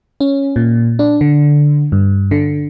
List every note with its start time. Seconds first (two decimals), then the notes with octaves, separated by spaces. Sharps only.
0.20 C#4
0.56 A#2
0.99 D4
1.21 D3
1.92 G2
2.31 D3